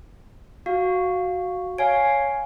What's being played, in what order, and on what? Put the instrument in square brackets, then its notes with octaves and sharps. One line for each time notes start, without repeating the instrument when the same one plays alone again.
[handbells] F#4 [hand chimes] F5
[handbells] C#5 F5 [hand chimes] G#5 D7